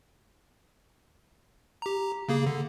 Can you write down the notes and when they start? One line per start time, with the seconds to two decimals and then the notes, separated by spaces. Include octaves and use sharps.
1.82 G4 A#5
2.28 C#3 A#3 G#4
2.46 D3